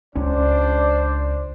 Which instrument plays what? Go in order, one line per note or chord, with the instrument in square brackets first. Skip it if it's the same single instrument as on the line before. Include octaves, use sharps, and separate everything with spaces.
[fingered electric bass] C#2 C#4 [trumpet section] D4 C5 D5